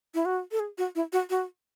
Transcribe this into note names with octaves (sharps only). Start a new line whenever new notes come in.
E4
F#4
A4
G#4
F#4
E4
F#4
F#4